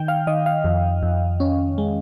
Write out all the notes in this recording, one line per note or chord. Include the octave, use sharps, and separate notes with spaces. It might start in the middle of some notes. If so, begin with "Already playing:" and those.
Already playing: D#3 G5
F5
D#3 D#5
F5
F2
F2
C#4
G#3